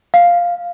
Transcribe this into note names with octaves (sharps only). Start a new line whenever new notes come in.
F5